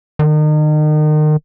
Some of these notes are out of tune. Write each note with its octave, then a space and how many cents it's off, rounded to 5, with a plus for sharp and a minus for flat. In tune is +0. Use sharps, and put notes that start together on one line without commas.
D#3 -35